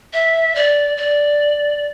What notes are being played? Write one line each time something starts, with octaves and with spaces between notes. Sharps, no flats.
E5
D5
D5